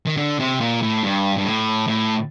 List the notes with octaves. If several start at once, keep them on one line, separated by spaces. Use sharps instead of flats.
D#3
D3
C3
A#2
A2
G2
G2
A2
A2